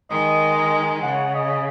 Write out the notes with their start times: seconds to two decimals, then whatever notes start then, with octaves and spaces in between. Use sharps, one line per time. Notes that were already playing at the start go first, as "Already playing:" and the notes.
0.10 D#3 G#3 D#5
1.03 C#3 F#5
1.35 D#5